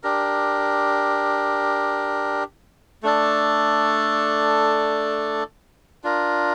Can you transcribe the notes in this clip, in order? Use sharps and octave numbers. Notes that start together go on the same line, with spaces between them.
D4 G4 A#4
A3 D4 A4 D5
D4 F4 A#4